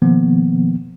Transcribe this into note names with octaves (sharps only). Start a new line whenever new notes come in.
B2 D#3 F3 A#3 B3